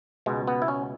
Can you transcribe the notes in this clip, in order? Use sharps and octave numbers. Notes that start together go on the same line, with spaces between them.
C#2 B2 G#3
B3
E4
C#4